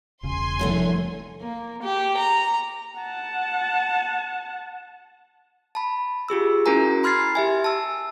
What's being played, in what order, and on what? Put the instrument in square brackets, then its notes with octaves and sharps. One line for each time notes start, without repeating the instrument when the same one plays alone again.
[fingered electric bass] E1 C#3 [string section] G#5 C6
[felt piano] F1 C2 [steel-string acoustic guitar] F#2 D3 A3
[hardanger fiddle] A#3
G4
A#5
[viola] F#5 A5
[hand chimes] A5 B5
F4 G4 G#4 E6
C#4 E4 F#4 A#4 G#5 A#5
B5 C6 F6 G#6 A6 C7
G4 E5 G#5
A5 E6